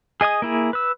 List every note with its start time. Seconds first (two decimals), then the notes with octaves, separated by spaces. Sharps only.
0.21 G#4 D#5 G#5 D#6
0.42 A#3 E4 G#4
0.73 B4 E6